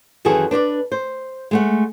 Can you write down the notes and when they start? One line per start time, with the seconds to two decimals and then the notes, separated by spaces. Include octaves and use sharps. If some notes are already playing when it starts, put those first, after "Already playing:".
0.25 F#2 D#3 E3 F#4 G#4 A4
0.51 D4 B4 C5 D5
0.92 C5
1.51 G#3 A3 F#5